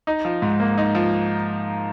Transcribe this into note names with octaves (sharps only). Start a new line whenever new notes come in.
D#4
F3
G#2
A#3
D#4
F3